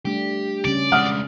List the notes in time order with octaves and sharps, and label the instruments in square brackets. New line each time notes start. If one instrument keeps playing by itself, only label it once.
[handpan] G3 A3 D4 [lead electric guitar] G4
[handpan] C#3 G3 C#4 [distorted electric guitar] D5
[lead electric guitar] G#3 D4 [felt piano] F#5 D#6 F6